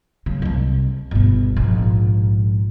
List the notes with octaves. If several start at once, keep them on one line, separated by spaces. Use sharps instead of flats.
C#3 F#3
C2 C3
G1 B2
A#1 G#2